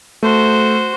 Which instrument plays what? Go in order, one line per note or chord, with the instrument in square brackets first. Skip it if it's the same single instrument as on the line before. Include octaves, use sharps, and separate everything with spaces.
[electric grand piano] A3 [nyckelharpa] F#4 C5